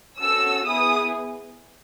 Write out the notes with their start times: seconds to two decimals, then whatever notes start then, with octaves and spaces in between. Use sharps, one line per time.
0.21 C#4 F#4 A4 E6
0.65 B3 E4 G#4 D#6